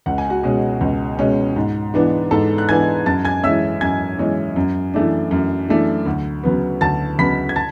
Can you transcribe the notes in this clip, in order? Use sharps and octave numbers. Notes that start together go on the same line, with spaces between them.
C#2 F#5
G#5
F#4 F#5
B2 G#3 C#4
C#2
B2 G#3 C#4
G#2
E3 B3 D4
G#2 A4 A5
F#6
E3 B3 D4 G#5 G#6
F#2 A5 A6
G#5 G#6
E3 G#3 C#4 E5 E6
F#2 G#5 G#6
E3 G#3 C#4
F#2
E3 A3 D4
F#2
E3 A3 D4
D2
C#3 F#3 B3
D2 A5 A6
C#3 F#3 B3 B5 B6
G#6
A5 A6